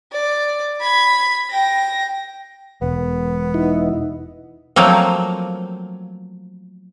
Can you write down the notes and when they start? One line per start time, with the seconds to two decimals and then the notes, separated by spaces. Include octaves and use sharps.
0.13 D5
0.81 B5 G#6
1.51 G5 A#6
2.82 E1 B3
3.54 D#4 E4
4.76 F3 F#3 A3 A#3 C4